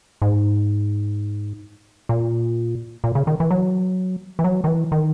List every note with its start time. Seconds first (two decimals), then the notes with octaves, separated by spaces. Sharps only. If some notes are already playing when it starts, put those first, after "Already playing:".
0.22 G#2
2.09 A#2
3.04 A#2
3.15 C#3
3.27 D#3
3.40 E3
3.51 F#3
4.39 E3
4.44 F#3
4.64 D#3
4.68 E3
4.92 D#3